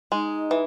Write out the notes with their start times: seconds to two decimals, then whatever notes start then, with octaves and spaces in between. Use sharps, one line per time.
0.12 G#3 D#4
0.51 E3